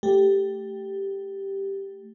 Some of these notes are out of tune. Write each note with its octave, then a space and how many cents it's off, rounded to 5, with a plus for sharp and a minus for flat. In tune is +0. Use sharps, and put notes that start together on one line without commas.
A3 +0 G4 +0